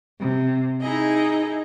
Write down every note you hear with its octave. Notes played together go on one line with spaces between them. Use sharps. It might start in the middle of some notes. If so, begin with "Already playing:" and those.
C3
D#4 E4 G#4 D#5